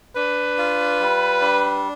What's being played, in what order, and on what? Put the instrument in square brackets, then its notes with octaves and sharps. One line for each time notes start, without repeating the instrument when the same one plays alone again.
[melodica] D4 [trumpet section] B4
[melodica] F4
G3
D4